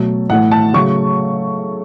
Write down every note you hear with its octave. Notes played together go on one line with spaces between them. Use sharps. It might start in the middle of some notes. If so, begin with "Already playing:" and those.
Already playing: B2 F#3 A3
A2 E3 A3 F#5
A5
C#3 F#3 A3 C#6